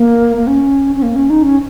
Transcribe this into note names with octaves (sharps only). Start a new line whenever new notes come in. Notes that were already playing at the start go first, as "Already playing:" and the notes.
Already playing: A#3
A#3
C#4
C#4
A#3
C#4
D#4
C#4